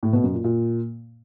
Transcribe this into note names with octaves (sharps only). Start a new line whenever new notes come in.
A2
B2
F#2
A#2
A#2